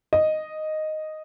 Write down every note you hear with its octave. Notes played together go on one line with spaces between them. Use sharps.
D#5